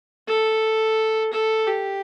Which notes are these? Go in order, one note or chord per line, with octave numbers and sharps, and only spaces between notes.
A4
A4
G4